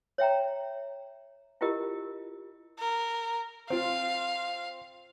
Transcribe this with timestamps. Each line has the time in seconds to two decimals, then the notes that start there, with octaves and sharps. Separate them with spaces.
0.18 C#5 E5 G5 A#5
1.61 E4 F4 G4 A#4 D#5
2.79 A#4
3.70 C4 F4 F5